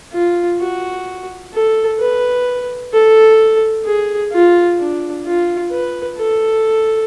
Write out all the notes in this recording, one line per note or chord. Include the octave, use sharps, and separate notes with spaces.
F4
F#4
A4
B4
A4
G#4
F4
D4
F4
B4
A4